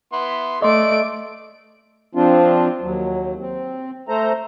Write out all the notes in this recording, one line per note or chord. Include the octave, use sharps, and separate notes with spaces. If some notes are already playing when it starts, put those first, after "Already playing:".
B3 E4 C6
A3 D5 D#5 C6 D7
F3 C4 D4 F4
D#2 F#3
C4
A3 A4 C5 A#5